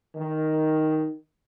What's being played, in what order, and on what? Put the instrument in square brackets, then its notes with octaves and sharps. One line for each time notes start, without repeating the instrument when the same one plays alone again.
[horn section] D#3